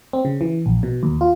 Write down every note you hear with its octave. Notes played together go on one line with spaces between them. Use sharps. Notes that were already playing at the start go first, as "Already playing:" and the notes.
C4
C#3
E3
A#1
B2
D#2
F4